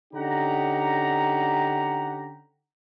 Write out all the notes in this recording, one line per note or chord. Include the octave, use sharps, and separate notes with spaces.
D3 C#4 D#4 G4 F#5 A#5